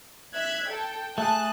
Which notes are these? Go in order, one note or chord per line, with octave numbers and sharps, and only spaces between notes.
E5 F#6 G#6
A4 G5
A3 G#4 A5 F#6